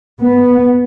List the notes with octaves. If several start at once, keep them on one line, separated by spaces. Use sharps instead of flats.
B3